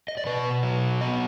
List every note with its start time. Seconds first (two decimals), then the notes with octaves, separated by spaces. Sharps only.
0.08 D#5
0.18 D5
0.26 B2 B4
0.63 F#3
1.01 B3 D#5